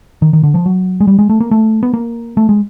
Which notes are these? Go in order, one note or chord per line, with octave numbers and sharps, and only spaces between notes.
D#3
D#3
D3
F3
F#3
G#3
G3
G#3
A3
A#3
A3
B3
A#3
A3
G#3